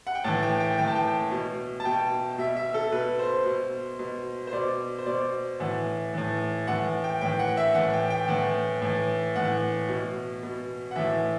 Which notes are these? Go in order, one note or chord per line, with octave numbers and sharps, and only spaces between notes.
F#5
G5
A2 E3 A5
G5
G5
A2 E3 G5
A5
G5
B2
A5
B2 G5
B2 E5
E5
A4
B2 B4
C5
B2
B2
C5
B2 D5
C5
B2 D5
A2 E3 F#5
A2 E3
A2 E3 F#5
G5
A2 E3 G5
F#5
E5
A2 E3 F#5
G5
G5
A2 E3 F#5
A2 E3
A2 E3 F#5
B2
B2
F#5
A2 E3 E5